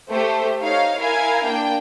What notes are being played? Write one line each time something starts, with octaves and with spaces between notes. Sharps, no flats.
A3 G4 C5
D#4 C#5 F5
E4 A#4 F5 G#5
A#3 D4 G5